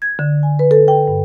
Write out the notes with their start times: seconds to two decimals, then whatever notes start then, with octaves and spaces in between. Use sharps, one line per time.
0.02 G#6
0.19 D3
0.43 G#5
0.59 B4
0.71 A4
0.88 G5
1.08 G2